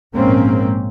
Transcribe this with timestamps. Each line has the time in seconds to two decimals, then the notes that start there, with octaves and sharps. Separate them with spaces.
0.15 A#1 G#2 G#3 A#3 C4 C#4